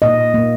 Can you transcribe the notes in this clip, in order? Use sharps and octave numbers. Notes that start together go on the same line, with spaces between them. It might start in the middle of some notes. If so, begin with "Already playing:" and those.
A#2 A#3 D#5
A#2 A#3